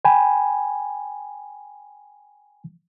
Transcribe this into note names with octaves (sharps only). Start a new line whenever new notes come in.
G5 G#5 B5